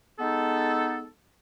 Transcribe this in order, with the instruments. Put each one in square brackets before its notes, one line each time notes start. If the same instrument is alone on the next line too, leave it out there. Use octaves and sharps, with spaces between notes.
[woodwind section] G#3 B3 D#4 A4